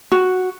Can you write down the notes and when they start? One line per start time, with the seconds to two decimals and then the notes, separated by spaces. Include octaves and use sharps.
0.12 F#4